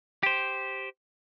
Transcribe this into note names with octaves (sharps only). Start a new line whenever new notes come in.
G4 C5